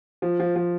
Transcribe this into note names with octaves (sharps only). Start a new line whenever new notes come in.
F3
F3
F3